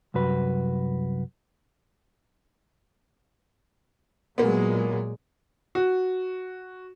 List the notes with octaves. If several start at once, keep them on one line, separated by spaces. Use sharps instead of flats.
C2 F#2 F#4 B4
A#2 F#3 G#3 A#3 B3
F#4